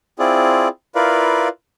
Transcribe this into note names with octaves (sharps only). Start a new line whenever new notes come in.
C4 E4 F4 G#4 D5
E4 F4 A#4 B4 D5 F5